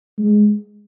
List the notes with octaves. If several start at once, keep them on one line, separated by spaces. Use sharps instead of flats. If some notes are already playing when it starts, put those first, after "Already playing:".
G#3